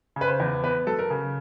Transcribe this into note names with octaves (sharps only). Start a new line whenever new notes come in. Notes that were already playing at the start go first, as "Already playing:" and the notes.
C#3
B4
C5
E2
B3 B4
F#3 A4
A#4
C#3